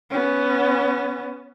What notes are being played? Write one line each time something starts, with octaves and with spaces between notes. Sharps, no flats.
B3 C#4